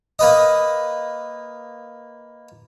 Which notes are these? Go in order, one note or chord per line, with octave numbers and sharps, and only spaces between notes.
A#3 B4 D#5